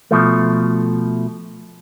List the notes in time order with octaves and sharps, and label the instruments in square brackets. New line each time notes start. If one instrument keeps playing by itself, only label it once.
[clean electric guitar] B2 F3 A3